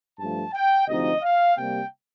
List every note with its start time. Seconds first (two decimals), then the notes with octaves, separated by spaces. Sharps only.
0.18 G2 F3 A3 A5
0.53 G5
0.87 D2 C3 F3 C4 D#4 D#5
1.22 F5
1.56 C3 G3 A#3 G5